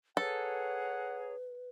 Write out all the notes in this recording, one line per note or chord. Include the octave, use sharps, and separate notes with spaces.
G#4 A4 B4 C#5 F#5 A#5